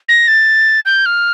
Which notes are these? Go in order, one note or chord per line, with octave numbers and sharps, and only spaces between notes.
A#6
A6
G6
F6